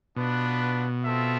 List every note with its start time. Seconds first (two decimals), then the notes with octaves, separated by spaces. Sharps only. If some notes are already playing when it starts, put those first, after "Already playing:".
0.16 B2 B3 D4 F4 B4
1.05 C4 F4 A4 E5